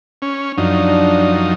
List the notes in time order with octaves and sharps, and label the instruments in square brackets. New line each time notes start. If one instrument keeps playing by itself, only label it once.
[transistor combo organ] C#4
[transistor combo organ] F#2 F3 D#4 [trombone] D4